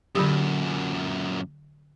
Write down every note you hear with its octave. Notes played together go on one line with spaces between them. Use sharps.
F#2 A#2 D3 F#3 G4